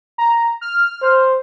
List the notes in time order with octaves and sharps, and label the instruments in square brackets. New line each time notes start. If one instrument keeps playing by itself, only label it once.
[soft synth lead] A#5
F6
[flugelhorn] C5